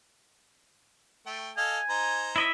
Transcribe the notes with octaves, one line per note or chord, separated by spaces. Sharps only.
A3 G5
A4 D#5 F5 G#5
D#4 C5 A#5
E4 D#5 E5